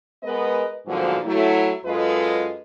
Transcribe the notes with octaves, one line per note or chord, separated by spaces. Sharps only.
G#3 B3 A#4 B4 D#5
G#2 B2 D3 F3 F#3 A#3
F#3 A3 E4
F#2 G#3 F4 A4 B4 D#5